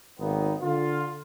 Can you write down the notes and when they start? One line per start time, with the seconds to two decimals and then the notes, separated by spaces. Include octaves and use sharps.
0.20 G#1 D#3 A#3 B3 D#4
0.62 D3 F4